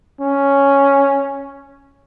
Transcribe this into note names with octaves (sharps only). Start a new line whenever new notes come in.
C#4